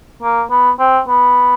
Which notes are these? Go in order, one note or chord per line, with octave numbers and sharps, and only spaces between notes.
A#3
B3
C4
B3